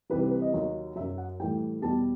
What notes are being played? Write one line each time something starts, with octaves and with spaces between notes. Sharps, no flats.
C2 C3 E3 G3 B4
B4
B4
D#5
D#2 D#3 F#3
F#2 F#3 E5
F#5
A2 E3 G3 G5
E2 B2 G3 A5